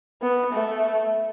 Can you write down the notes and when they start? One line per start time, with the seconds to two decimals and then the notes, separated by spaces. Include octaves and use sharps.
0.22 B3
0.53 A3